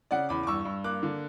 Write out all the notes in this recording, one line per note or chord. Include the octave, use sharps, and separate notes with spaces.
C#3 D5 F#5
E2 B5 D6
D6
G2 C#6 E6
G2
A#3 D6 F#6
D3